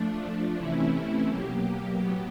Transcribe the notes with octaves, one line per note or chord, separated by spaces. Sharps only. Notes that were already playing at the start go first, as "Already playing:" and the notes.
Already playing: F3 A3 D4
C3 E3 A3 C#4 E4
B2 F#3 A#3 G4
A2 F#3 B3